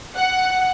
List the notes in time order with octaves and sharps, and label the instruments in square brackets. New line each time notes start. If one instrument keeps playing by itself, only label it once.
[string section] F#5